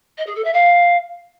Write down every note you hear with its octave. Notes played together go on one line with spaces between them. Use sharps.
D#5
G#4
A4
E5
F5